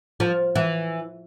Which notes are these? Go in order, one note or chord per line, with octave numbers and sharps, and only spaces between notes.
F3
E3